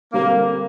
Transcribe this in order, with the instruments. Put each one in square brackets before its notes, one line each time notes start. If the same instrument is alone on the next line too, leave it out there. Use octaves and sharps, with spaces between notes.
[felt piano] D3 G3 C4 G4 [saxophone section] A#3